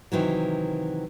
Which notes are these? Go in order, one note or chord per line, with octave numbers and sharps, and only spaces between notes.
C3 D#3 E3 F#3